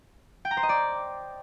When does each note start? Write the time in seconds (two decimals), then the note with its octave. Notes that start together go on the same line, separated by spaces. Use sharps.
0.45 G5
0.51 A#5
0.57 C5
0.63 D#5
0.69 D5